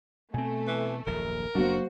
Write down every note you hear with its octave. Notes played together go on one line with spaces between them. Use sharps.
B2 A3 C4 G#5
E3
D#1 A#1 F#2 A#4
F#1 F#3 A#3 D4 F#4 C5